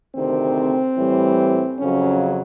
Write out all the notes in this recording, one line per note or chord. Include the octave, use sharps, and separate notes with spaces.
D2 C3 D#3 C4
A2 E3 G3
F2 C#3 F#3 C#4